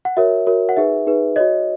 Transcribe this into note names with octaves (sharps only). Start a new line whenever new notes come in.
F#5
F#4 A#4 C#5 E5
F#4 A#4 C#5
F#5
D#4 G#4 B4 E5
D#4 G#4 B4
F#4 C#5 D#5